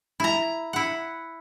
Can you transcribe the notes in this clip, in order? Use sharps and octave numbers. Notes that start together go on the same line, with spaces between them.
E4 A#5
E4 F#5